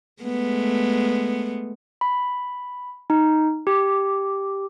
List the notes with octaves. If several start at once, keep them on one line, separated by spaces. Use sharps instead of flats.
G#3 A3 B3
B5
D#4
G4